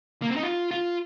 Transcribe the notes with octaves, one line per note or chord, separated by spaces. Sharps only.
A#3
C4
D#4
F4
F4